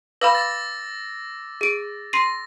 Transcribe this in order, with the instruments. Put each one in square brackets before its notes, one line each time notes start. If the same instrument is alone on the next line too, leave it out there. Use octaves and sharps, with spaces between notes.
[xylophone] B4 F5 B5 [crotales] D6 E6 A#6
[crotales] D6 A6
[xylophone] G#4 D7
[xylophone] C6 C7 D#7 [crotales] A#6